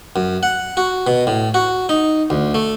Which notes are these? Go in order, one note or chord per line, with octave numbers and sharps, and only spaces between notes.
F#2
F#5
F#4
B2
A2
F#4
D#4
D2
A3